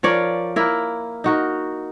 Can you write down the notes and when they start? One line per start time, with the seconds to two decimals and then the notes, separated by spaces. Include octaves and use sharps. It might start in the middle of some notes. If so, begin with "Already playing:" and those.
0.03 F3 A#4 C#5 D5
0.56 A#3 E4 A#4
1.24 D#4 F#4 A#4